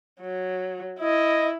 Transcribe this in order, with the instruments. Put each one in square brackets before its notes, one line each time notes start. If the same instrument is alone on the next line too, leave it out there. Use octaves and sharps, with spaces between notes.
[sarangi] F#3
[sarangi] E4 [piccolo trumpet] D#5